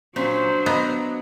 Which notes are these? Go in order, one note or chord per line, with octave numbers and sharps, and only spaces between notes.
A#2 F#3 C#4 D4 C5
B3 D#5 A#5